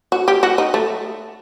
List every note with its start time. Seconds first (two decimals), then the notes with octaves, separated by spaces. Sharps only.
0.12 F#4
0.28 G4
0.43 F#4
0.58 D#4
0.74 A3